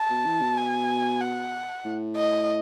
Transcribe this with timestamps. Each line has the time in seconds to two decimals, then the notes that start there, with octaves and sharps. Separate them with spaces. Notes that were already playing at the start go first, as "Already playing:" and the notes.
Already playing: A5
0.10 B2
0.26 E3
0.41 B2
0.57 G#5
1.21 F#5
1.84 A2
2.16 D#5